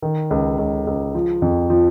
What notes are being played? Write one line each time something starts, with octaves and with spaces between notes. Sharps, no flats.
D#3
C#2
C#2
C#2
F3
F2
F3